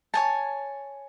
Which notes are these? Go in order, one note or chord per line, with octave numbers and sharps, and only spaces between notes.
C#5 G#5 A5